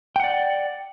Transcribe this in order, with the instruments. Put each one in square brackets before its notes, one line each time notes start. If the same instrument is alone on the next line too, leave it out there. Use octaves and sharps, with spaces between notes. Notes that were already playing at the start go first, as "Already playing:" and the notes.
[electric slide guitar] G5
F#5
D5